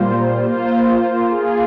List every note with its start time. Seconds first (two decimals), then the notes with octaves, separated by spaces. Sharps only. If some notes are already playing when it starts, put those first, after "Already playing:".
Already playing: A#2 G3 A#3 F4 C5
0.46 A#3 F4 C5
1.30 A#3 F4 G#4